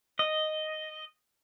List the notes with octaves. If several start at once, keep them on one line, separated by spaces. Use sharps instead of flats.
D#5